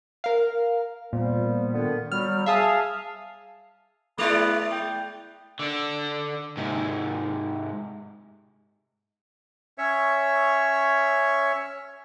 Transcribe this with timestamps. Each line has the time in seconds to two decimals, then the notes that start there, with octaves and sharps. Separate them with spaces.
0.24 A#4 F5
1.13 A#2 F3 G3 B3
1.73 D3 D#3 B3
2.12 F#3 G3 F6
2.46 G#4 E5 F5 A5 D#6
4.18 G#3 B3 E4 D5
4.72 G5
5.59 D3 D4
6.57 G#2 C3
9.78 C#4 C#5 E5